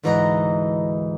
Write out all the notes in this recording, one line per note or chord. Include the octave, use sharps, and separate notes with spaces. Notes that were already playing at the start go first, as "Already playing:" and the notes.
D2 G#2 E3 D#4 D#5 A#5